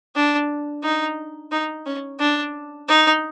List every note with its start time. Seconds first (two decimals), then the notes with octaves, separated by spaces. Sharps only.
0.16 D4
0.83 D#4
1.52 D#4
1.86 C#4
2.20 D4
2.88 D#4